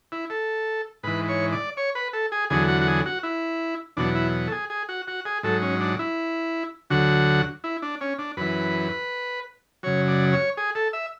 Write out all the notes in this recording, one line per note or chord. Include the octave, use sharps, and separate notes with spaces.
E4
A4
G#2 E3 B4
C#5
D5
C#5
B4
A4
G#4
E2 D3 F#3 G#4
F#4
F#4
G#4
F#4
E4
E2 B2 F#3 D4
E4
A4
G#4
G#4
F#4
F#4
G#4
G#2 F#3 A4
C#4
D4
E4
D2 D3 F#3 F#4
E4
D4
C#4
D4
F#2 E3 B4
F#2 C#3 F#3 C#5
D5
C#5
G#4
A4
E5